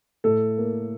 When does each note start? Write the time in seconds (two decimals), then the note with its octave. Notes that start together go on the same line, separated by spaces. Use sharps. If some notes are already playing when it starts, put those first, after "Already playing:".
0.24 A2 A4
0.58 A#3